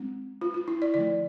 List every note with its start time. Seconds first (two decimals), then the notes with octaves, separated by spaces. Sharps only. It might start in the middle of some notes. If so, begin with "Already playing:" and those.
Already playing: G#3 C4
0.41 F4
0.54 F4
0.68 E4
0.82 D5
0.94 D3 F3 A3 D5